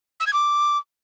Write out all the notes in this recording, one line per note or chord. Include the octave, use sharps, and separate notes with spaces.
E6
G#6
D6